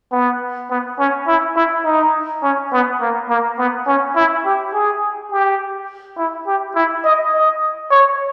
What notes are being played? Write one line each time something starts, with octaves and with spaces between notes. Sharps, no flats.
B3
B3
C#4
E4
E4
D#4
C#4
B3
A#3
A#3
B3
C#4
E4
G4
G#4
G4
E4
G4
E4
D#5
D#5
C#5